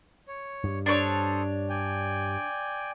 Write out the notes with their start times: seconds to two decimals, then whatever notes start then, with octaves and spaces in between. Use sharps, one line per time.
0.28 C#5
0.64 G2
0.86 D4 A4 C5 C#5 D#6
1.69 D5 G5 G#5